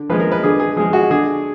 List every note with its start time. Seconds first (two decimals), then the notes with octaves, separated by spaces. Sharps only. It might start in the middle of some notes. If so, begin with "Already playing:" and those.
Already playing: D3
0.09 F3 G#3 B4
0.20 A#4
0.32 B4
0.43 D3 G#4
0.59 G#4
0.76 F3 G#3 G#4
0.93 F#4
1.11 D3 G#4